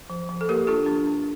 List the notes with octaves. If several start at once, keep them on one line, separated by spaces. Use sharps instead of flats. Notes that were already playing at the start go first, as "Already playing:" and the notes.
F3
F3
A4
A#3 G4 A#4
D4 F4 A4
D4
D4